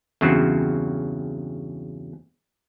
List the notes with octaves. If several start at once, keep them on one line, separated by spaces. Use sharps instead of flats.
E2 G2 C#3 F#3 C4